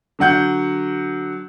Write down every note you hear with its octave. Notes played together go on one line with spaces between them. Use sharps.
D3 F#3 F#5 G6